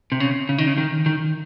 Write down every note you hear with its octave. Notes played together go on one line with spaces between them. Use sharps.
C3
C#3
C#3
D#3
C#3
D#3
D#3